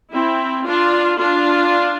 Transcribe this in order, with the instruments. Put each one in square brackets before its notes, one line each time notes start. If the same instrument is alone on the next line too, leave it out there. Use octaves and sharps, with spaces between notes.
[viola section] C4 E4
D4 F4
D4 F4